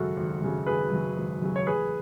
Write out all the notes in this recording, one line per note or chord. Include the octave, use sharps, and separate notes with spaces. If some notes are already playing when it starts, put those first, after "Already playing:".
Already playing: G#1 F#2 C#3 F#3 F#4 A4
G#1
F#2 C#3 F#3
G#1 G#4 B4
F#2 C#3 F#3
G#1
F#2 C#3 F#3
C#5
A1 G#4 B4